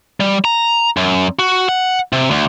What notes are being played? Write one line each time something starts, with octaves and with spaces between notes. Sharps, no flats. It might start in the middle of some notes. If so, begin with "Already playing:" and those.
G3
A#5
F#2
F#4
F#5
C3
D2